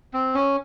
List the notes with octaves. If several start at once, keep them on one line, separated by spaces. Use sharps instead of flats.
C4
C#4